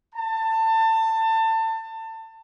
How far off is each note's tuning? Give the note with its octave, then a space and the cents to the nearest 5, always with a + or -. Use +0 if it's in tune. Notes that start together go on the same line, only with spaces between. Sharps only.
A5 +25